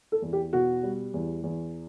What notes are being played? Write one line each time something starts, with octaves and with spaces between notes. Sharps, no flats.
A4
E2
G4
B2 F#4
G3
E2
E2